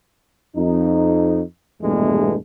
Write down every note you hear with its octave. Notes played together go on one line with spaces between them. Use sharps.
F2 D#4
A#1 E2 G2 B2 G#3 A3